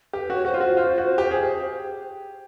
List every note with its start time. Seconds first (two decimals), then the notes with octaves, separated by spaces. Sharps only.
0.13 G4 B4
0.30 F#4 C#5
0.45 F#4 C5
0.54 F4
0.61 F#4
0.77 F4
0.98 F#4
1.18 G4
1.31 G#4
1.43 G4